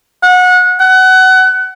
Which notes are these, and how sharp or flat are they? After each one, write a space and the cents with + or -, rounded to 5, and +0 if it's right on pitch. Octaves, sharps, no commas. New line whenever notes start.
F#5 -25
F#5 +25